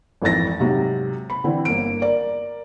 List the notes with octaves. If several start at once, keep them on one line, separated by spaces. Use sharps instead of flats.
G#1 F2 E3 A4 A6 A#6
G#2 C3 F#3
B5
D3 E3 C4
G1 A#3 D7
A#4 D5